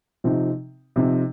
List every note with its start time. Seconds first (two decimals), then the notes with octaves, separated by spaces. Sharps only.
0.24 C3 F3 C4 D#4
0.96 C3 F3 C4 D#4